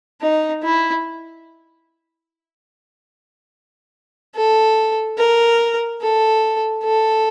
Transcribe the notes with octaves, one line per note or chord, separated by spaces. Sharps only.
D#4
E4
A4
A#4
A4
A4